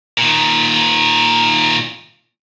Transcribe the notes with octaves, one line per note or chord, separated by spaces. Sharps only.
A#2 D#3